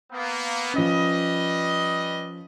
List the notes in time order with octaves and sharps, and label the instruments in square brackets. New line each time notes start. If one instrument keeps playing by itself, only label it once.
[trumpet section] A#3 B3
[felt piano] F3 C#4 [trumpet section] G3 B4 D#5